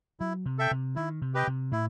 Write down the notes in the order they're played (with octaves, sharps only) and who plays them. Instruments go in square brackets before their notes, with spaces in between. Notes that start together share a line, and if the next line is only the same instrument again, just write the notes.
[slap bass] F#3 [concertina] E4
[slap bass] C3
[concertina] A4 E5 G5
[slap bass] C3
[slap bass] D#3 [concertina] E4
[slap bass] C3
[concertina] G4 B4 D#5 G5
[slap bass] C3
[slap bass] A2 [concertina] E4